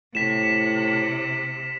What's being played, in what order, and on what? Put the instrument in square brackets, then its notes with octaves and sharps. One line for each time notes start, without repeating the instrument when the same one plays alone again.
[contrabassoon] A2 [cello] C3 [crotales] B6 E7